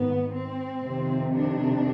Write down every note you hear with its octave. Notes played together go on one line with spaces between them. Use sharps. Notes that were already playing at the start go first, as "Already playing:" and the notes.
Already playing: G#2 D#3 B3
C4
F2 C3 D#3
D4